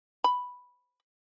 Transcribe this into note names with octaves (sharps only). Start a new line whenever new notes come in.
B5